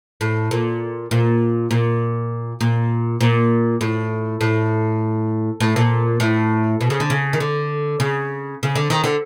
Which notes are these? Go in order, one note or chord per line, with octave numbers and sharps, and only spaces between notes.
A2
A#2
A#2
A#2
A#2
A#2
A2
A2
A2
A#2
A2
B2
C#3
D3
C#3
D#3
D3
C#3
C#3
D3
D#3
D3